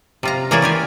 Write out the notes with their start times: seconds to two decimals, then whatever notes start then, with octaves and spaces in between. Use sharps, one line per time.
0.23 C3 F4 A#5
0.51 E3 A#3 E4 G#4 C#5 D5
0.62 F4 G4 G#5